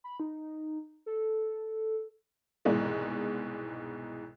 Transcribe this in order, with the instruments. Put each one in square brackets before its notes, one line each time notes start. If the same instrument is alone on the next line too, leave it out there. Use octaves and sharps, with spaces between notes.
[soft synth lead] B5
D#4
A4
[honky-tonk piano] C2 G#2 B2 E3 G#3